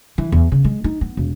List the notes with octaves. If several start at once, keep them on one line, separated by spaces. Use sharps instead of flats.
E3
E2
C#3
G#3
D#4
B3
E1